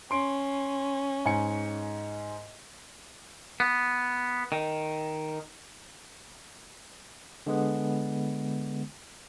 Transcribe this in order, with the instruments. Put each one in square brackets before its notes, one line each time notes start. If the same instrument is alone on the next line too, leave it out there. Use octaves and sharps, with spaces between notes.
[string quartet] C#4 [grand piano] C6 D7
[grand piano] G#2 G#5 C#7
[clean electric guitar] B3
D#3
[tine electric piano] D3 G#3 B3